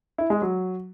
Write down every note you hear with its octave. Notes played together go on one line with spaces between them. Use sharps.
E4
G#3
F#3